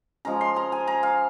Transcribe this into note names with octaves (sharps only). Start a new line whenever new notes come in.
F3 G#3 C#4 A#5
C6
A#5
G#5
A#5
F5